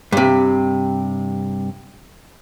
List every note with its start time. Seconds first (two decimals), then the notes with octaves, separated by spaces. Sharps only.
0.12 G2 C3